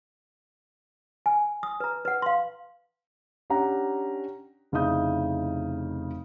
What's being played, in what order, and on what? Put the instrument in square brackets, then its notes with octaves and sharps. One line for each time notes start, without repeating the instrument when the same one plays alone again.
[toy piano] G#5
D#6
B4 A#5
B4 F#5
F5 C6
[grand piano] C#4 D4 G4 F#5 A#5
F1 C#3 D#4 E4 D#6 G6